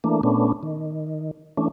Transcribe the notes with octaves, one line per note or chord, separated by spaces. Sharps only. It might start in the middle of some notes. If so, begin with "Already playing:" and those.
E3 A3 A#3 D4
A#2 A3 B3 C#4 D4
D#3
E3 A3 C#4 D4